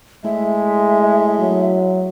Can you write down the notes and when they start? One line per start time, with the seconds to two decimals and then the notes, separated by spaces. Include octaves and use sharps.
0.24 A2 G#3 E5
1.39 F#3